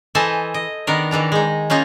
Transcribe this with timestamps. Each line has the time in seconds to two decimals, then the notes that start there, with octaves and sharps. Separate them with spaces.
0.15 E3 A4 C5 D#5 G#5 A5
0.54 D#5
0.87 D#3 B3 D4 A#4
1.11 D#3 E3 D4 A#5
1.32 G#3 D#4
1.70 A#3 C#4 D#4 F4